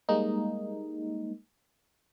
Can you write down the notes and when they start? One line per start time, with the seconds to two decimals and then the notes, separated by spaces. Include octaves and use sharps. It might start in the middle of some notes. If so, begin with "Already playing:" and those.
0.09 G3 G#3 A#3 D#4